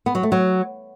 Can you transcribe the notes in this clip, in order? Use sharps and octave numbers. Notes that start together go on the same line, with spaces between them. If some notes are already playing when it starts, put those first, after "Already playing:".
B3
F#3
A3
F#3